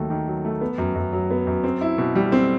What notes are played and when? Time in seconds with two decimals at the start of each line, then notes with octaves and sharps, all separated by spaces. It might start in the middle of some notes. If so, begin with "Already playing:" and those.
Already playing: D#2 F#3 A3
0.10 D#3
0.27 F#3
0.45 A3
0.61 B3
0.78 F#2
0.95 F#2
1.13 F#3
1.30 B3
1.47 F#2
1.64 C4
1.81 E4
1.98 B2
2.15 G3
2.32 C4